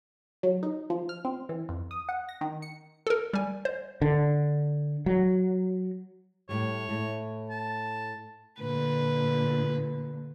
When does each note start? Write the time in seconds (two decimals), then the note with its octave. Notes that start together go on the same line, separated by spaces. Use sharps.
0.43 F#3
0.63 D#4
0.90 F3
1.09 F6
1.25 C4
1.49 E3
1.69 F2
1.91 D#6
2.09 F#5
2.29 A#6
2.41 D#3
2.62 C#7
3.07 A4 A#4
3.34 G3 G#5
3.65 C5
4.02 D3
5.06 F#3
6.49 A2 G3 C#5
6.89 A2 A3
7.50 A5
8.60 A#2 D3 B4